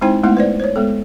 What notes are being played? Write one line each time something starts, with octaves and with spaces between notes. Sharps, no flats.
G#3 C4 D#4 E4 C5 G5
G#3 A3 B3 D#4 E4 F#5
B4 C5 D5
C5 C#5
G#3 B3 A4